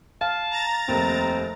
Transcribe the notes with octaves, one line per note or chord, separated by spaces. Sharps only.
F5 A5
A#5 A6
F1 D#2 C4